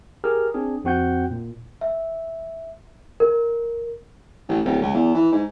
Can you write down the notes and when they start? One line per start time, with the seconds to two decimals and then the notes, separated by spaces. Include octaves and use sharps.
0.24 G4 G#4 A#4 F6
0.54 C4 D4 G#4
0.84 F2 C4 F#4 F#5 G5 G6
1.30 A#2
1.81 E5
3.20 A#4
4.49 A1
4.65 D1
4.82 C#2
4.94 E2
5.15 E3
5.32 G#2